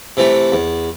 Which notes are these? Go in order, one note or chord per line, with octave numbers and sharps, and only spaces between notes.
C3 E3 A3
E2